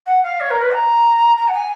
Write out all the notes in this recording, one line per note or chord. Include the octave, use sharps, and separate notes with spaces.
F#5
F5
C#5
A#4
B4
A#5
A#5
F#5
G#5